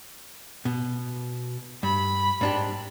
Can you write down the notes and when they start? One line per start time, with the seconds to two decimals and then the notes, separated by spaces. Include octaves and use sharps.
0.65 B2
1.83 G2 B5
2.41 G#2 D4 G4